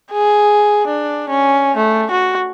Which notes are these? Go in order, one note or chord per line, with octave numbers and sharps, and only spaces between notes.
G#4
D4
C#4
A3
F#4